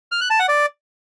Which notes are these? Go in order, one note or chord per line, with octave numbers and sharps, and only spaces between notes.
F6
F#6
A5
F#5
D5